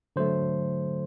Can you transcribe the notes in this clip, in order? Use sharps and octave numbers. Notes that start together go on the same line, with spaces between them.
D3 F#3 A3 C5